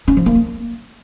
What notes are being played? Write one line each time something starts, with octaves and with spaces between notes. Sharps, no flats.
C#4
F3
A#3
D4